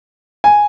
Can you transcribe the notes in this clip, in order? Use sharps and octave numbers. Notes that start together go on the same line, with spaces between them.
G#5